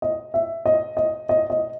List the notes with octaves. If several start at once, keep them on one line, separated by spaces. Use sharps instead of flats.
D#5
E5
D#5
D#5
D#5
D#5